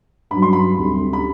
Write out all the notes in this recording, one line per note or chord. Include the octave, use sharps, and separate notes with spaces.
G2 F#3 B5
C6
B5
D2 C3 G3
B5